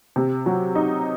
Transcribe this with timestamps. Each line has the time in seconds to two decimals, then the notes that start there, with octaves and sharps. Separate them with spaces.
0.16 C3
0.46 F#3
0.75 D#4